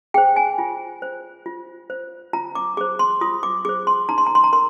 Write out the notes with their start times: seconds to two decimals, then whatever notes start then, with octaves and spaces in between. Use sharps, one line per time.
0.14 G#4 C5 G5
0.36 G#5
0.58 F4
1.02 C5
1.46 F4
1.90 C5
2.33 F4 A#5
2.55 D6
2.77 G#4 C5 D6
2.99 C6
3.21 F4 D#6
3.43 D6
3.65 G#4 C5 D6
3.87 C6
4.09 D#4 A#5
4.18 C6
4.27 A#5
4.35 C6
4.44 A#5
4.53 A#4 C6